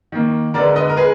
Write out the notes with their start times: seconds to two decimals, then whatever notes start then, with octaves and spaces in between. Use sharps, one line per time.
0.12 D#3 A#3
0.54 D3 G#3 B3 A#4 D5
0.76 B4 D#5
0.89 A#4
0.97 G#3 B3 G#4 B4